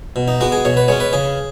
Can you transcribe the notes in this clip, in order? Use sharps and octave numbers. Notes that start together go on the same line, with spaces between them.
B2
D#4
G#3 B3 F#4
G#4
B2 C#5
B4
G#3 C#4 C#5
B4
C#3 G#4